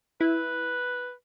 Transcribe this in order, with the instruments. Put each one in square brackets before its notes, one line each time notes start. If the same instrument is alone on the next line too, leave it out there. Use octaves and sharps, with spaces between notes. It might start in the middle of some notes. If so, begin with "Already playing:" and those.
[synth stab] E4 [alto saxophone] B4